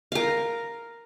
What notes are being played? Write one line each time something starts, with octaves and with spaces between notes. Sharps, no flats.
A#4 F5